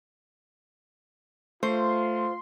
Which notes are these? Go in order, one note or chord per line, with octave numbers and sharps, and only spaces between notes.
A3 F4 C5 C6